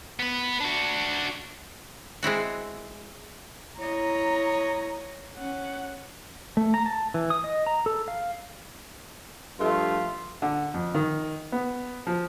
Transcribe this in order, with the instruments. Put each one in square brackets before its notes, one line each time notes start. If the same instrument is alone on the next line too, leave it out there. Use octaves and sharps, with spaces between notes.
[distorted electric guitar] B3 B4
D4 F#4
[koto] G#3 C4 E4 F#4
[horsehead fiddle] E4 A#5 [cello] C#5 D#5
[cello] C#4 [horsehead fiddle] F#5
[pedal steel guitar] A3
A#5
A5
E3
D#6
D#5
A#5
A4
F5
[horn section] G2 F3 A3 F4
[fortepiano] D3
F2
D#3
B3
F3